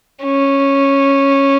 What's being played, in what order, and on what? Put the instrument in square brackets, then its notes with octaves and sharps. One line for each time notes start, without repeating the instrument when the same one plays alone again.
[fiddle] C#4